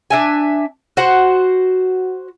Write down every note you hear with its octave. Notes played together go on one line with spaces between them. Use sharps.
D4 E5 G#5
F#4 C5 F#5